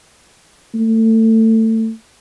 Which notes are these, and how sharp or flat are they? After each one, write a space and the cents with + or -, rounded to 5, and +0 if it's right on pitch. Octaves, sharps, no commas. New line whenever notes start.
A3 +25